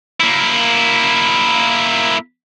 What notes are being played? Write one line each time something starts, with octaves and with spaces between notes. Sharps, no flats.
A#3 E4